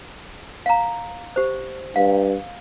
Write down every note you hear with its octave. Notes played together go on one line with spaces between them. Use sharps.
F5 A#5
G4 C5
G2 F5